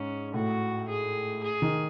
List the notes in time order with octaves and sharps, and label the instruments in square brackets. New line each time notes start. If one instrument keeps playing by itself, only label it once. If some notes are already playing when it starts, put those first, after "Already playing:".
Already playing: [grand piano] G#2 [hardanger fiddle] C#4
[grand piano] A2 [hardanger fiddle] F#4
[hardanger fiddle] G#4
G#4
[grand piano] D#3